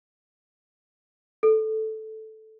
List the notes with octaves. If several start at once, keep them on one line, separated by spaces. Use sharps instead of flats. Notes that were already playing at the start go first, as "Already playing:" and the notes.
A4